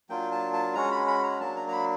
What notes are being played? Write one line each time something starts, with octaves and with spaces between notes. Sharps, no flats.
F#3 A#3 D4 F4 G5
A5
A5
G#3 C#4 F#4 A#5
B5
B5
A#5
F#3 A#3 D4 A5
A#5
A#5
B5